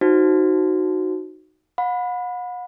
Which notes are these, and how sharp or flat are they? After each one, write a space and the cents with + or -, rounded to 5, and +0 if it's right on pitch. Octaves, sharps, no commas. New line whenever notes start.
D#4 +0 F#4 +0 C5 +0
F#5 -40 B5 +0